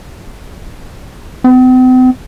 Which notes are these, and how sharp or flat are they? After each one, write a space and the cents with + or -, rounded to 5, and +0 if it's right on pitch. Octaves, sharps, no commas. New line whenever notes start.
C4 -45